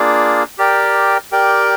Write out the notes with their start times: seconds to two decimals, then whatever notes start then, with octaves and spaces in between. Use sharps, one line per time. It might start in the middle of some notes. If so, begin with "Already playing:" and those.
Already playing: A#3 D4 F4 G#4 D5
0.58 G4 A#4 D5 G5
1.32 G4 A#4 D5 G5